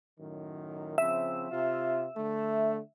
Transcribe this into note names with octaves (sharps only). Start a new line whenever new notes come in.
F#2 A2 D#3
C#3 F3 C4 E5
C3 F4
D3 A3